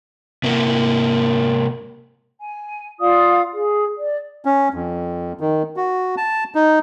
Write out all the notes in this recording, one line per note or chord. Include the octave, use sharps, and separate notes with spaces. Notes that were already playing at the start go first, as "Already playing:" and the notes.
C3 A#3
G#5
F4 D5 F5 D#6
G#4
D5
C#4
F2
D#3
F#4
A5
D#4